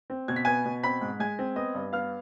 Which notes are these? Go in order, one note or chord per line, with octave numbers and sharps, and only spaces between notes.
C4
B2 G#6
B6
B3 G#5 G#6
B2
C4 B5 B6
G#2
G#3 G#5 G#6
C4
B3 D#5 D#6
G2
B3 F5 F6